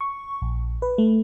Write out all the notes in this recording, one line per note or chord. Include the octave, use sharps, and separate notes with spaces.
C#6
A#1
B4
A3